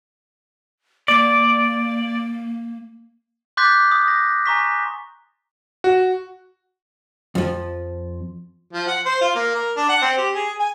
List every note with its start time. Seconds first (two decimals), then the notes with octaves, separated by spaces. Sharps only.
1.08 A#3 D5
3.57 C6 D6 F#6 G6 A6 B6
3.92 D#6
4.08 A#6
4.46 G#5 A#5 C#6 B6
5.84 F#4
7.35 F2 F3
8.73 F3
8.88 F#5
9.06 C5
9.21 F4
9.35 A#3
9.55 A#4
9.77 D4
9.89 F#5
10.02 C4
10.18 G4
10.35 G#4
10.60 G#5